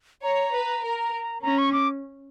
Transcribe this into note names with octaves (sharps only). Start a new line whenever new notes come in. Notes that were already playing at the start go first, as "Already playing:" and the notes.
C#5 A#5
B4
A#4
C#4 A#5
C#6
D6